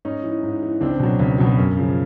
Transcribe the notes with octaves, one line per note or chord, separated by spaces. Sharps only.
G#2 C#4 D#4
E3
G#2
E3
C#2 C4 D4
B2 F#3
C#2
B2 F#3
F#2
C#3 F3